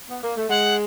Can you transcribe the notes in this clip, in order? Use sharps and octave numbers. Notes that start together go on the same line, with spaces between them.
B3
A#3
A3
G#3 F#5